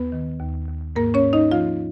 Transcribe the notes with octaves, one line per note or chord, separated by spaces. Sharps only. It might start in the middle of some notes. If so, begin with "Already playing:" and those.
Already playing: D#2 B3 B4
D#3
D#2
D#2
G#2 A#3 A#4
C#4 C#5
G#2
D#4 D#5
F3 F4 F5